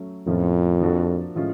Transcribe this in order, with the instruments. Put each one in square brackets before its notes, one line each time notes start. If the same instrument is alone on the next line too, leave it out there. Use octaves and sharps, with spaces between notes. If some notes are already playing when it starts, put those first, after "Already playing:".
Already playing: [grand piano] F#3 A3 C#4
[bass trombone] F2 [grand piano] A2 F3 A#3 C#4 F4
[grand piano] F3 A#3 D4 F#4 A4
A2 F3 G#3 C#4 F4